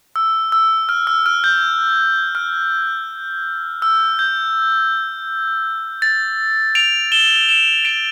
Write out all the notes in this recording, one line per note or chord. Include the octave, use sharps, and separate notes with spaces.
E6
E6
F6
E6
F6
G6
F6
E6
G6
A6
D7 F7
E7 G7
E7 G7
D7 F7